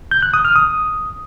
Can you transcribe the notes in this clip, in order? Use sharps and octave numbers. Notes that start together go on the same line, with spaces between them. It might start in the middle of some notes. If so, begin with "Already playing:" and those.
G6
F#6
D#6
F6
D#6